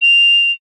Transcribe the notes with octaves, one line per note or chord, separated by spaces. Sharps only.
F7